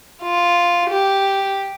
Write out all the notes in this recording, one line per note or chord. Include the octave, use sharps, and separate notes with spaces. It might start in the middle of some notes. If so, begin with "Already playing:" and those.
F4
G4